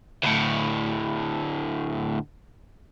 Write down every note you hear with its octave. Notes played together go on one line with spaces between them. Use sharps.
D2 A2